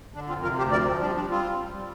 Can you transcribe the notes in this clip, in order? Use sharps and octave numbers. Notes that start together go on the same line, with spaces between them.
D3 D4
F2 C4 F4
C3 F4 A#4
D2 G4 C5
F3 A#4 D5
F3 C4
G3 D4
G3 D4
G3 C4 F4
G3
G3
G3